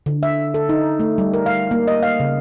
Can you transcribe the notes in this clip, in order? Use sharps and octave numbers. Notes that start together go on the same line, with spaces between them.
D3
E5
A4
D#4
A3
G3
A#4
F5
A#3
D#5
F5
C#3